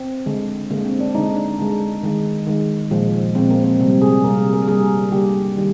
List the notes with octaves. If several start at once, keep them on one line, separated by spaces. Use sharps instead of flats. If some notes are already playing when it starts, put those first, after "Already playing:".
Already playing: C4
D3 G#3
D3 G#3 A#3
C4
D4
D3 G#3 D#4
D4
D3 G#3
D#3 G#3
D#3 G#3
A#2 F3 G#3
A#2 F3 G#3 C4
A#3
C4
C3 G3 A#3 C4
G#4
C3 G3 A#3 A#4
G#4
A#4
D3 G3 A#3 G#4
D3 G3 A#3 G4
D#3 G3